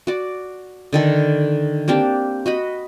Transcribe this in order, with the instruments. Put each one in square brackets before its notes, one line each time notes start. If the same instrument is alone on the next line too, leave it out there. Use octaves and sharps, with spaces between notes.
[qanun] F#4 D5
D3 D#3 A4
A#3 C4 D4 G4
F#4 D#5 B5